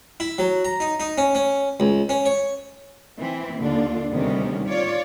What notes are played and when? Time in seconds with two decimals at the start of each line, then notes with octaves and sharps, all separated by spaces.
0.20 E4
0.38 F#3
0.65 A#5
0.80 D#4
1.00 D#4
1.18 C#4
1.35 C#4
1.80 C#2
2.09 C#4
2.26 C#5
3.19 E3 C4 E4
3.58 D#2 D3 D4 F4
4.10 D2 C3 D#3 G3 B3 C#4
4.68 F4 C#5 D5